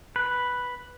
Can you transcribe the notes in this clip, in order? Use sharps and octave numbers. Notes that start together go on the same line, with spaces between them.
B4